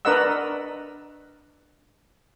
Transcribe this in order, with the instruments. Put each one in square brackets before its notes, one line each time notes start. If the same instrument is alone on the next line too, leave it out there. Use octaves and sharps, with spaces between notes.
[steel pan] D4 A#4 B4 D#5 F#5 E6